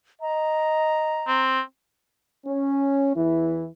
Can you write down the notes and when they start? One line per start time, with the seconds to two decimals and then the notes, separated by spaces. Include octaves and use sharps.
0.22 D#5 A#5
1.27 C4
2.46 C#4
3.16 E2 E3 E4